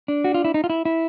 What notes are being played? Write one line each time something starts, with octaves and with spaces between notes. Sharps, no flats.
D4
F#4
F4
E4
D#4
F4
E4
E4